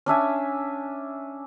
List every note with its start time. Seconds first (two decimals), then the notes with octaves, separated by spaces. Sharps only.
0.06 C#4 D4 E5 G#5